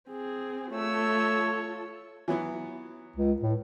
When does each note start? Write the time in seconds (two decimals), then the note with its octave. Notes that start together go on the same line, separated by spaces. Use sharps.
0.11 C4 G#4
0.73 A3 F4 A4 C#5 E6
2.28 E3 F#3 B3
3.16 C#2
3.42 A2